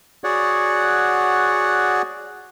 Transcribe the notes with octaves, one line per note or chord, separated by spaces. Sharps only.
F#4 G#4 C#5 D5 F#5